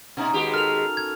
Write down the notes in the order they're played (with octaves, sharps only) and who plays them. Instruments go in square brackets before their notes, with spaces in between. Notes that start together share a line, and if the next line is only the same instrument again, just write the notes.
[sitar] B2 [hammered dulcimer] C#4 D#4
[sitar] D#2 G#3 G4 [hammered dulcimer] F#4 B4
[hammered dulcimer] A4 A#4 [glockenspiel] F6 F7
[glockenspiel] G#6